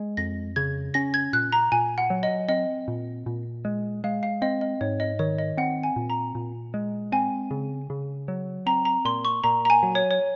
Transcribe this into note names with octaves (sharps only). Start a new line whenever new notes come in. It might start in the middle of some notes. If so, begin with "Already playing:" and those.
Already playing: G#3
F2 A#6
C#3 G#6
C#4 A#6
G#6
A#2 F#6
A#5
A#2 G#5
F#5
F#3
D#5
C4 D#5
A#2
A#2
G#3
G#3 F5
F5
C4 D#5
D#5
G#2 C#5
D#5
D#3 C#5
D#5
C4 F#5
G#5
A#2
A#5
A#2
G#3
C4 G#5
C#3
C#3
F#3
C4 A#5
A#5
A#2 C6
C#6
A#2 A#5
A#5
G#5
F#3
C#5
C#5